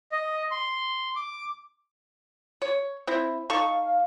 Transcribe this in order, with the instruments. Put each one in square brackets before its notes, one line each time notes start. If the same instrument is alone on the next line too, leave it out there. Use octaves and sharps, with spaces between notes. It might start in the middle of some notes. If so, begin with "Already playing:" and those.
[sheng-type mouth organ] D#5
C6
D6
[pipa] C#5
C4 E4
[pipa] D#4 A4 C#6 [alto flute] F5